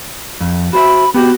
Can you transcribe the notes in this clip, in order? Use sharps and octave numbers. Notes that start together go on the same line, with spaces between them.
F2
F#4 C5 E5 B5
B3 F#4 G4